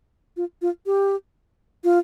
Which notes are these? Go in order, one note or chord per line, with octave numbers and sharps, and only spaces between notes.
F4
F4
G4
F4